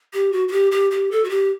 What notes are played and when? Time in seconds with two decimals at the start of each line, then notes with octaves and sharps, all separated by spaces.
0.13 G4
0.32 F#4
0.48 F#4
0.52 G4
0.72 G4
0.91 G4
1.11 A4
1.24 F#4
1.29 G4